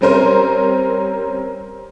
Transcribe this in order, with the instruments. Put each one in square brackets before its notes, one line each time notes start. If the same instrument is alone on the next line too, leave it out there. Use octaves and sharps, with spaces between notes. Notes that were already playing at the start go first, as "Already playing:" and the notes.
[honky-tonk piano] G3 C4 C#4 A#4 C5